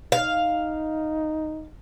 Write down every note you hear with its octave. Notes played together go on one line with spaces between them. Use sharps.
D#4 F5